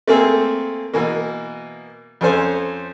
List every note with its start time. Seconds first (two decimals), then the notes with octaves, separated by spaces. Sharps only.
0.08 A3 A#3 C4 G#4 A4
0.94 B2 E3 A#3
2.21 F2 C#4 A4 C5 G#5